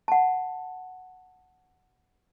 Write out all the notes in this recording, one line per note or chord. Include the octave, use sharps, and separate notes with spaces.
F#5 A5